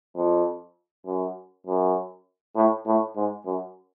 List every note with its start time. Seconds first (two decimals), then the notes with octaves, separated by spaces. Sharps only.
0.16 F2
1.06 F#2
1.66 F#2
2.56 A2
2.86 A2
3.16 G#2
3.45 F#2